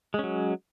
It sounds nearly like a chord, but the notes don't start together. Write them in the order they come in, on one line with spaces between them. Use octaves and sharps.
G#3 C#4 F#3